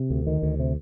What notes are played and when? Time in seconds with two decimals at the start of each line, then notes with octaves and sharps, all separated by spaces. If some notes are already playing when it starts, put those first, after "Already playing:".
Already playing: C3
0.10 D2
0.27 D#3
0.42 D2
0.59 C3